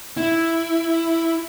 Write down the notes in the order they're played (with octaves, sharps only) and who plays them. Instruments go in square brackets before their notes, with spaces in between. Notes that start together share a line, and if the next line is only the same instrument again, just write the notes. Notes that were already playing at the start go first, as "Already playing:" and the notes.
[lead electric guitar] E4